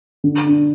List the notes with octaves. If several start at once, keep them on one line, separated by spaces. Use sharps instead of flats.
D3
D4